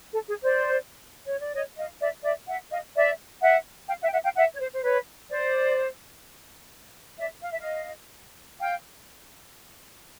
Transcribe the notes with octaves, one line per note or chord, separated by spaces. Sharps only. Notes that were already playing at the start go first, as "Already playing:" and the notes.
A4
G#4
C5 D5
C#5
D5
C#5 D#5
D#5 F5
D5 E5
D5 E5
E5 F#5
D#5 F5
D5 E5
E5 F#5
F5 G5
E5 F#5
G5
E5 F#5
F5 G5
E5 F#5
C#5
C5
C5
B4 C#5
C5 D5
D5 E5
F5
E5
D#5 F5
F5 G5